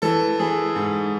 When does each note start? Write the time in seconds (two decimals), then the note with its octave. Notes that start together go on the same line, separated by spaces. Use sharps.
0.02 E3 A4
0.39 E3 G#4
0.76 G#2